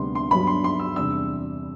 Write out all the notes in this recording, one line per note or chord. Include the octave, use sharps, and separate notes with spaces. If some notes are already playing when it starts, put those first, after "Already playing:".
Already playing: D2 C3 G3 B3 D4 C6
C6
G2 F#3 B3 D4 B5
C6
C6
E6
E2 C3 G3 D4 E6